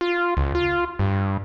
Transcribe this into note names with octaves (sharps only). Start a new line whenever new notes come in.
F4
C#2
F4
G2